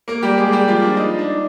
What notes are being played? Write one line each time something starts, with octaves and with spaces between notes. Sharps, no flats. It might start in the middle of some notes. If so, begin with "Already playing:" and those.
A#3 A#4
G3 G4
G#3 G#4
G3 G4
F3 F4
D4
D#4
D4